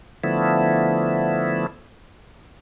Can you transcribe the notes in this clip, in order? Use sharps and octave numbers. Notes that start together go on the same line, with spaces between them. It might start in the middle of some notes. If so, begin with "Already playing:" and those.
D3 F3 A3 B3 E4